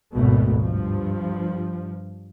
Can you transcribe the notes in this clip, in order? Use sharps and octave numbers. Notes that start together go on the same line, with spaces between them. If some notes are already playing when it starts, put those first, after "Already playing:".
G#1 D2 B2 A3
G2 F3